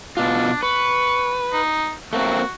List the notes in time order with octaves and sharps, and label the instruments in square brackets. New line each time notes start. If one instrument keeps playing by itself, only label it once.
[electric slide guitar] B2 F4 [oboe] D4
[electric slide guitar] B4 [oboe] C#6
[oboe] D#4
[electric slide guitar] A3 A#3 C4 [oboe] F#4